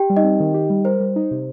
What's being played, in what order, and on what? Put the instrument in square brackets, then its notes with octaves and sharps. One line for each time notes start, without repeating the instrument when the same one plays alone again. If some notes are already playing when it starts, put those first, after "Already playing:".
Already playing: [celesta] G4 G5
[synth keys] G3
[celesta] D#4 D#5
[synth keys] C4
D#3
G4
G3
[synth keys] A#4 [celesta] C5
[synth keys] G3
D#4
C3